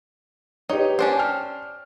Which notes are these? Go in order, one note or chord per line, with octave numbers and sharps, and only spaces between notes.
D#4 G4 B4 C#5
C#4 D4 C5
G5 F6